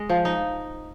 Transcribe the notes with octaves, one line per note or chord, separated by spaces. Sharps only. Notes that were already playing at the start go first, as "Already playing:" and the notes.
Already playing: G#3 D#5
F3
D#4